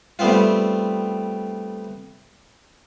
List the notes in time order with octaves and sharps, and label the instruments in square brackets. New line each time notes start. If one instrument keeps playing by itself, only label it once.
[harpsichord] G3 A3 B3 C4 F4